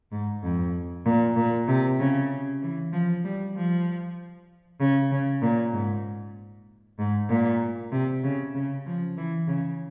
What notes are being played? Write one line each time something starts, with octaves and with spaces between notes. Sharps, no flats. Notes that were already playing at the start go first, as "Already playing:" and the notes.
G#2
F2
A#2
A#2
C3
C#3
E3
F3
G3
F3
C#3
C#3
A#2
G#2
G#2
A#2
C3
C#3
C#3
F3
E3
C#3